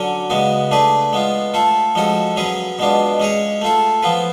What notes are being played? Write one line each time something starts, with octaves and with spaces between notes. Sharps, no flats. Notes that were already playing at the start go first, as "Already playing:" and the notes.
Already playing: D3 F#3 C#4
C#3 G#3 B3 F#4
A3 D4 G#4 B4
G#3 B3 F4
A3 F4 A4
F3 G#3 C#4 F#4 A4
F#3 C#4 G#4 B4
B2 G#3 B3 D4 F4
G#3 C#4 G#4 C#5
A3 F4 A4
F3 B3 F4 B4